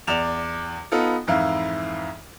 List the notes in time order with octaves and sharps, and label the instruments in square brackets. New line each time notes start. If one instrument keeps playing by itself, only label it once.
[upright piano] E2 D5 E7 F7
B3 D#4 F4 A4
F2 G#2 E3 E4 F5